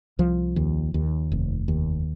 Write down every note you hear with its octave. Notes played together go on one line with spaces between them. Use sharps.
C2 F3
D#2
D#2
F1
D#2